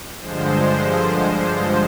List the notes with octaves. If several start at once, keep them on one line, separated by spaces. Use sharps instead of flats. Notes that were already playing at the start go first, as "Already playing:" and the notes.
G2 D3 F3 G#3 C5